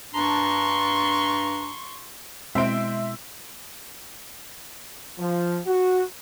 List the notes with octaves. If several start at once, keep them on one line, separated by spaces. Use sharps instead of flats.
G2 D4 A#5 C6 C#6
B2 G#3 C4 E4 C5 E5 D7
F3
F#4